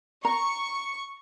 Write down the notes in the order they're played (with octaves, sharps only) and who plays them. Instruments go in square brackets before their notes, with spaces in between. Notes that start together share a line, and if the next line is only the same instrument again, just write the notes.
[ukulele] A#5 [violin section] C#6